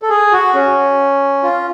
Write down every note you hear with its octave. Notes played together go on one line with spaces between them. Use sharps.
A4
G#4
F#4
C#4
F4